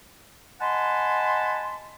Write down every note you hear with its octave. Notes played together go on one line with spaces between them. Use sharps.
D#5 F#5 G#5 A5 B5 C6